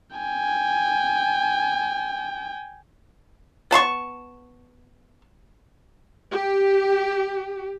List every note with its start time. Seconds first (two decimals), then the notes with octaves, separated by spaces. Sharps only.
0.17 G5 G#5
3.71 B3 A5 C6 C#6
6.33 G4